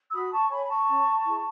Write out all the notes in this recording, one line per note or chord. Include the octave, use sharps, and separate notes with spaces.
E6
F#4 B5 D#6
A5 C#6
A4 C#5 G#5 B5
B5
A5 C#6
C#4
E4 G#4